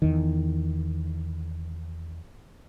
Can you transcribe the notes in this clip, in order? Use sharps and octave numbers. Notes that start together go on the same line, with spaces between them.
E2 D#3